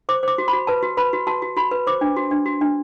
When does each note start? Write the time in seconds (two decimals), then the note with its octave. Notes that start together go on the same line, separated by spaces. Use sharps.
0.09 C5 D6
0.23 C5 D6
0.38 F#4
0.48 B5
0.53 F#4
0.67 B4 A5
0.83 F#4
0.97 B4 B5
1.13 F#4
1.27 F#4 A5
1.42 F#4
1.56 F#4 B5
1.71 B4
1.87 C5 D6
2.01 D4
2.16 F#4
2.31 D4
2.46 F#4
2.61 D4